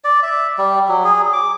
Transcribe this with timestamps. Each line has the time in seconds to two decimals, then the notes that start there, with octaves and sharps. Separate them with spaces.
0.04 D5
0.23 E5
0.58 G3
0.89 F#3
1.04 G#4
1.33 D6